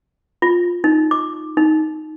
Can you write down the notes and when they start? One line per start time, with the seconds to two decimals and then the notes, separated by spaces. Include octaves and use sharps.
0.42 F4
0.84 D#4
1.11 D6
1.57 D#4